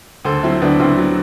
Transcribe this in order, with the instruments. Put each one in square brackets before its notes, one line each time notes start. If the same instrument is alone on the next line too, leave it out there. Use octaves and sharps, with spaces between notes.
[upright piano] D2 A4 C5
F#3 C4 E4
D2 B3 D4
D2 C4 E4
F#3